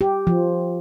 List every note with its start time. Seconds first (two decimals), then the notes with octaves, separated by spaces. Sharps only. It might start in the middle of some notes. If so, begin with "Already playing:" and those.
0.01 G4
0.27 F3